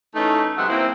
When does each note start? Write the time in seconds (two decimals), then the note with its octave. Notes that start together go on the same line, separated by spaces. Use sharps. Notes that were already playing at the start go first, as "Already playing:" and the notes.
0.15 E3 A3 C#4 D#4
0.57 C3 F#3 G#3 B3 E5 F#5
0.69 A#3 C4 E4